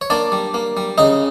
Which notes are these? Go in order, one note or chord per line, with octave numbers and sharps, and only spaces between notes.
C#5
A#3 D4 D5
G3
A#3
G3
C#3 D#4 D#5